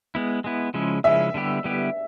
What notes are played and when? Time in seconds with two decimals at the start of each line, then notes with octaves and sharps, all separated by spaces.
0.15 G#3 B3 E4
0.44 G#3 B3 E4
0.74 C#3 F3 G#3 C#4 E4
1.04 C#3 F3 G#3 C#4 E4 E5
1.34 D3 G3 B3 E4 G4
1.64 D3 G3 B3 E4 G4